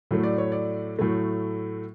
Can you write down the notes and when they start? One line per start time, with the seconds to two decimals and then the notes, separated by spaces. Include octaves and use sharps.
0.11 A2 F#3 A3
0.23 D5
0.38 C#5
0.52 D5
0.99 A2 F#3 A3